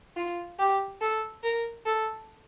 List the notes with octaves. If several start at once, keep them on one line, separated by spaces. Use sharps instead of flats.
F4
G4
A4
A#4
A4